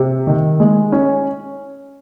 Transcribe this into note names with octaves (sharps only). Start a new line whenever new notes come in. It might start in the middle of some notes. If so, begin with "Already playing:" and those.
Already playing: C3
D#3
G#3
C#4